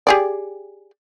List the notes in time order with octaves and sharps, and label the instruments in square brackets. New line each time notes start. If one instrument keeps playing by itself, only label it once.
[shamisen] G4 G#4 D5